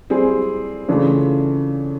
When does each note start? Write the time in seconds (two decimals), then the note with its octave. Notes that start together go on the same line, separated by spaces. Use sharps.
0.10 G3 C4 E4 G#4
0.88 C#3 E3 A3 D4 F4